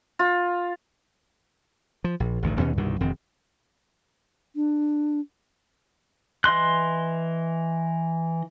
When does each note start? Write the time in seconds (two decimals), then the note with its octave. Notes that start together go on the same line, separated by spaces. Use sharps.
0.19 F4
2.04 F3
2.20 A#1
2.43 A1 D2 G2 D#3
2.59 D#2 B2 C#4
2.77 C2 G2 B2 D#3
3.00 E1 F2 D#3 C4
4.56 D4
6.44 E3 D#5 C6 F#6